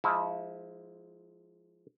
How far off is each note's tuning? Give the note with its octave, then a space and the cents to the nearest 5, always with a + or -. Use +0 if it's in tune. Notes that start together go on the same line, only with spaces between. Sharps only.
F3 +0 G#3 +0 E4 -30